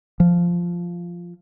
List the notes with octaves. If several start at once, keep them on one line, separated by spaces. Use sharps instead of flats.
F3